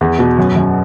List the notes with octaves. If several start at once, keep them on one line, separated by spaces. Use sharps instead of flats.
E2
B2
F#2
F#2